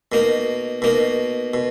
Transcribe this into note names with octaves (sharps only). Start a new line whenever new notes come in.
B2 A#3 D#4
B2 A#3 D#4
B2